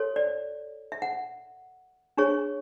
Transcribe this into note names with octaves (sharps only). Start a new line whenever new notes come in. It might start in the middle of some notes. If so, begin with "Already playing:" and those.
Already playing: F#4 A4 C#5
D5
E5
F#5
D4 G#4 C#5 C#6